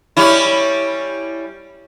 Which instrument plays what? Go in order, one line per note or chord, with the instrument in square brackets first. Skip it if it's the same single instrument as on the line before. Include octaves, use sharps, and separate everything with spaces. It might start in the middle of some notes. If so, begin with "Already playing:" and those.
[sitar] G3 C#4 E4